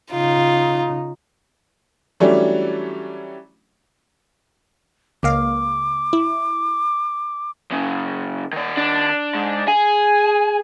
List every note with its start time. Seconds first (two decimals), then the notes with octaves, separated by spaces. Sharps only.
0.12 C#3 D#4 F4
2.20 E3 F#3 G3 A3 C#4 D4
5.23 C#2 A#3 F5 D6
6.13 E4
7.70 F#2 C#3
8.53 D#3 D5
8.77 D4
9.35 G#2
9.68 G#4 G#5